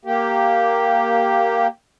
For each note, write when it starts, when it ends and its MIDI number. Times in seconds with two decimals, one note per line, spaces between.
0.05 1.67 58
0.05 1.67 67